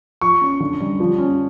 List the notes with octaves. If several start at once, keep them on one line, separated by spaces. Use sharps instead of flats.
F3 C#6
C#4
D3
G3
F3
C#4